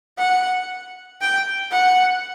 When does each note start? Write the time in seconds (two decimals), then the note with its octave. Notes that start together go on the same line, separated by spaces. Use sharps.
0.18 F#5
1.21 G5
1.71 F#5